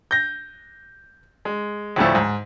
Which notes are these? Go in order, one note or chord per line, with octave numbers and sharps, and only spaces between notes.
G6 A#6
G#3
D2 A2 D3 F3 A3
G#2